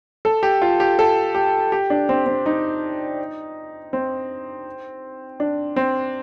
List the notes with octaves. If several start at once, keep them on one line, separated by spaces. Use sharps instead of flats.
A4
G4
F4
G4
A4
G4
G4
D4
C4
C4
D#4
C4
D4
C4